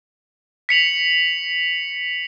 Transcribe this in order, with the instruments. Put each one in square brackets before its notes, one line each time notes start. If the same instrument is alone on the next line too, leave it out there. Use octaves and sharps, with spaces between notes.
[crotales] B6 C#7 F7 F#7